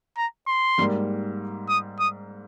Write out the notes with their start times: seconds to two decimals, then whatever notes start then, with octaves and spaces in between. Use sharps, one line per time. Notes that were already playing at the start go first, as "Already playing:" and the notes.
0.17 A#5
0.48 C6
0.78 G#2 G3 A#3
1.69 D#6
2.00 D#6